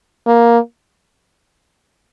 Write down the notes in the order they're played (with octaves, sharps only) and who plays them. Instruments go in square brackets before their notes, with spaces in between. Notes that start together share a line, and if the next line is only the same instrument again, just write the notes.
[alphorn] A#3